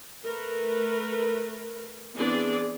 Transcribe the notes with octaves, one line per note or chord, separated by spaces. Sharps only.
A3 A#4 B4
E3 B3 C4 D4 G#4 D5